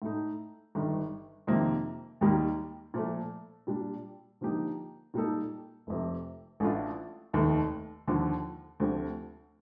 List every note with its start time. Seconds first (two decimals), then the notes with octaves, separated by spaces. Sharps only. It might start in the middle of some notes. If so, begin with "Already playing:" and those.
0.02 A2 A3 D#4
0.75 G1 G2 D#3
1.47 F2 C3 D#3 A#3
2.21 D#2 D#3 G3 A#3
2.94 A#2 F3 A3
3.67 A#2 G3 D4
4.41 D3 F3 A#3 D#4 G4
5.14 A#2 G3 A#3 D#4 A4
5.87 F1 F2 C3
6.60 A1 A2 A3 D4 F4
7.33 F1 D#2 D#3 A3
8.07 D#2 D3 F3
8.80 D2 D3 F3 C4 G4